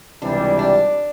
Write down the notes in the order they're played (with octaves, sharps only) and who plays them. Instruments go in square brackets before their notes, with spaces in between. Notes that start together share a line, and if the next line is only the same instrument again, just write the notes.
[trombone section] C#2 C3 E3 G3 [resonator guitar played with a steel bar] D4
[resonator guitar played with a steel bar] D4